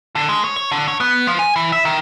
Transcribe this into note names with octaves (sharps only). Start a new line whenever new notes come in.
D3
G#3
C#5
C#5
D3
C#5
B3
F3
G#5
E3
E5
D#3